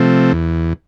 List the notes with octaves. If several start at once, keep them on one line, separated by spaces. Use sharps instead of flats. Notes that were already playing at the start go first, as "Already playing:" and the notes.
Already playing: C3 F3 A3 C4
E2